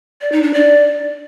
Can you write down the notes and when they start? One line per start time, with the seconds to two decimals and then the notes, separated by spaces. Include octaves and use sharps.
0.21 D5
0.32 D#4
0.43 D4
0.54 D5